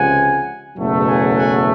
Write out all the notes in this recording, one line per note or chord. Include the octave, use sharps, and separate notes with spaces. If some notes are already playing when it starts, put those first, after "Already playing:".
Already playing: C#2 C3 F3 F#5 G#5
F#1 E2 B2 F#3 A3
F#5 G#5
F#5 G#5